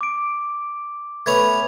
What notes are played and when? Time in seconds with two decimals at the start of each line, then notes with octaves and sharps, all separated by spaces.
0.01 D6 D7
1.26 A3 B3 C#4 G#6 F7